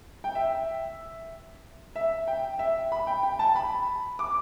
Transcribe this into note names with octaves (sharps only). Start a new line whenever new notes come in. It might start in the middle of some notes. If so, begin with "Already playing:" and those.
G5
E5
E5
G5
E5
B5
G5
G5
A5
B5
D6